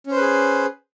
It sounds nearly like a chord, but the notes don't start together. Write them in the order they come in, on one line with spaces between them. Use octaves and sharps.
C#4 C5 B4 G#4